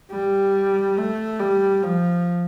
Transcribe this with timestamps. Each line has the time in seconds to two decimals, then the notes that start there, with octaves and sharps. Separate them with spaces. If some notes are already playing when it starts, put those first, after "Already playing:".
0.11 G3
0.98 A3
1.40 G3
1.82 F3